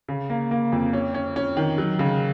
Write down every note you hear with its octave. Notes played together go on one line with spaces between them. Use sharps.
C#3
A#3
A#3
F2
C#4
C#4
C#4
D#3
F#3
C#3